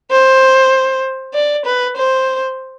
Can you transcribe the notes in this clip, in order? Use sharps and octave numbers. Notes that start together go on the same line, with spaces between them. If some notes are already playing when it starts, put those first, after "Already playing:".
C5
D5
B4
C5